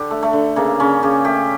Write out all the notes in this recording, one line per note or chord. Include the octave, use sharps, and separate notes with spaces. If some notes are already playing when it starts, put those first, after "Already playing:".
Already playing: D3 G4
A3
A3
D3
C#3 A#3
C#3 C#4
C#3 G4
A3 G4